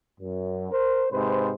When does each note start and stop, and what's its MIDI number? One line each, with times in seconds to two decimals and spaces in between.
0.20 0.70 42
0.71 1.07 70
0.71 1.07 72
1.12 1.52 44
1.12 1.52 48
1.12 1.52 71
1.12 1.52 72